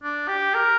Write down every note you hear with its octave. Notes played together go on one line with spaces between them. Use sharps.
D4
G4
A#4